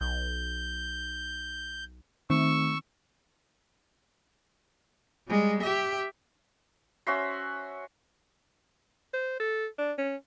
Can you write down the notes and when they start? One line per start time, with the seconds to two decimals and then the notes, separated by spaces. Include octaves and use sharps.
0.01 B1 G6
2.30 D#3 A3 C4 C#6 E6
5.28 G3 G#3
5.63 G4 E5
7.07 C#4 F#4 E5 C6
9.14 C5
9.40 A4
9.78 D4
9.98 C#4